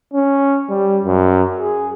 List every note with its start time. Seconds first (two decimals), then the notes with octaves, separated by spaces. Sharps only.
0.14 C#4
0.69 G3
1.04 F#2
1.59 G#4